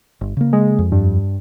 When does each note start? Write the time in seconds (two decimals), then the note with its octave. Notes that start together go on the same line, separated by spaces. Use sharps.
0.21 G1
0.37 C#3 A#3
0.53 G#3
0.79 F2
0.92 G2